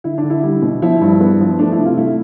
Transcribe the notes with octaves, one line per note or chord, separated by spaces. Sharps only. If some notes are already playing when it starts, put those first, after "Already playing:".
D3 E4
D4
D3
E4
G3
B2
F3 E4
G2
B3
F3
A3 D4
E4
C3
F4
A3 E4